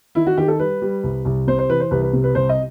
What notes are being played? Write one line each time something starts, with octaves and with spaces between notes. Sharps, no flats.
D#3 E4
F#4
D#3 G4
A4
G3 B4
G3
C2
C2
C3 C5
C5
E3 B4
C5
C2 B4
B4
C3
B4
C2 C5
D#5